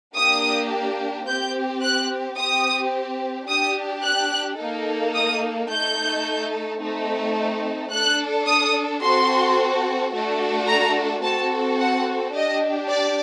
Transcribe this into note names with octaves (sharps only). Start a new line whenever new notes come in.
A#3 D4 G4 D#6
C4 G4 G6
F#6
C4 G4 D#6
D4 G4 D#6
F#6
A#3 D#4 A4
D#6
A3 D#4 A4 G6
A3 C4 D#4 A4
D4 A4 F#6
D#6
C4 F#4 A4 C6
A3 D4 F#4 A4
A#5
C4 F#4 A4 A5
F#5
D4 G4 D#5
D5